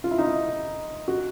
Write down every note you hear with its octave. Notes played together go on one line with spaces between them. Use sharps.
F4
E4
D#4
E4
F#4